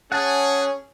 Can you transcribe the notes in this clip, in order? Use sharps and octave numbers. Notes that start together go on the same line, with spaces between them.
C#4 G#4 F#5 A5